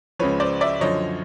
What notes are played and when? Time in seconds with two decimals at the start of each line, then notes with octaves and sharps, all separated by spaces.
0.19 C#2 C#3 F3 B4 C#5
0.40 C5 D5
0.61 D5 E5
0.81 F#2 D3 F3 C#5 D#5